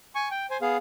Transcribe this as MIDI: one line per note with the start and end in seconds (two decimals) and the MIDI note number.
0.15 0.28 80
0.15 0.28 85
0.31 0.46 79
0.50 0.57 72
0.50 0.57 80
0.61 0.77 59
0.61 0.77 68
0.61 0.77 77